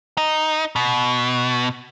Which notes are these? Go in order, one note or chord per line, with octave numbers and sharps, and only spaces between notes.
D#4
B2